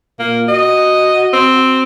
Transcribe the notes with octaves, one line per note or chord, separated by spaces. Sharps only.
A#2 A#3
F#4 D#5
C4